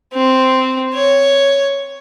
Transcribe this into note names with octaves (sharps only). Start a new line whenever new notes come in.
C4
C#5